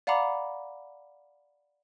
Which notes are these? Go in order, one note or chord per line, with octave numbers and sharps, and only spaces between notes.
D5 F5 F#5 A#5 B5 D6